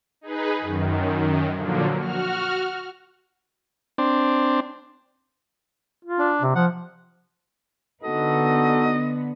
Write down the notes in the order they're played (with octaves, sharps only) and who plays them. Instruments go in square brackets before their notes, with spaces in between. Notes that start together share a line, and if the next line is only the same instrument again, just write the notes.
[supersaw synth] D#4 G#4 B4
F#2 D#3
A#2 D3 F3 F#3 A#3
F#4 F6
[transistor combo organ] C4 D4
[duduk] F4
[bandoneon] D4
[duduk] C3
[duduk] F3 [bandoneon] F#5
[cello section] D3 B3 [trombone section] D#4 F#4 A4 [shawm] D#5